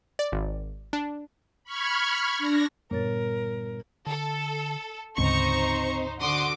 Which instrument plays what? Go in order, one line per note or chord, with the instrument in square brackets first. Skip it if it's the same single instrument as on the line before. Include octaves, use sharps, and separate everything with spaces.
[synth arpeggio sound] D5
G#1
D4
[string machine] B5 C#6 F6 G#6
D4 A#6
[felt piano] G1 [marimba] A#2 C#5 A6 [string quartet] A#4
[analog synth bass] D3 [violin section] A4
[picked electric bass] D2 G#2 C#3 [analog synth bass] C4 [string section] D#4 C5 [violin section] A#5 C#6
[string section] D3 F#4 D6 [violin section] C6 D#6